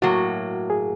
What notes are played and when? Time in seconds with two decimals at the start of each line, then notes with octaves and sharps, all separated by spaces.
0.02 A2 F#3 A#3 F#4
0.70 G#4